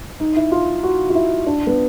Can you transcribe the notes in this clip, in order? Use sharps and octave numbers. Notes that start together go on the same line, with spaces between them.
D#4
E4
F4
F#4
F4
E4
D4
B3